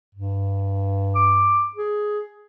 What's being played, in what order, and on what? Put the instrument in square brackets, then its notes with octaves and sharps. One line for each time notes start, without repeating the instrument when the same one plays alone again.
[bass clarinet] G2
[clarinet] D6
G#4